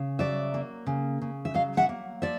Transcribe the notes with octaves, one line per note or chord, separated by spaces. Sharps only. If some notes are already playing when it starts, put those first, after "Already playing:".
Already playing: C#3
F#3 D5 E5
A#3
C#3
C#3
E5
F#3 D#5 F5
E5 F#5
A#3
F3 D5 E5